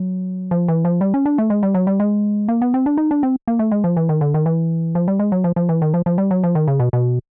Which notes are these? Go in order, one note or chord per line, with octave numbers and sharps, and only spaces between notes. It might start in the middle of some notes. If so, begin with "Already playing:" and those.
Already playing: F#3
F3
E3
F3
G3
C#4
D4
A3
G#3
G3
F#3
G3
G#3
A#3
B3
C4
D4
D#4
D4
C4
A#3
A3
G#3
F3
E3
D#3
D3
D#3
E3
F3
G3
G#3
F#3
F3
F3
E3
D#3
F3
F3
G3
F#3
F3
D#3
C#3
B2
B2